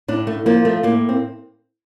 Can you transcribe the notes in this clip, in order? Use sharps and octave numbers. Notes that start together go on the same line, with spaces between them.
A2 D4
A3
F3 A#3
A3
A2 A#3
C4